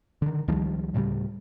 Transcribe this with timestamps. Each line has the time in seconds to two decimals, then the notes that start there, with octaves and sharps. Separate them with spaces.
0.22 D3 D#3
0.48 C#2 D#3 F3 G3
0.94 D2 A2 C#3 G3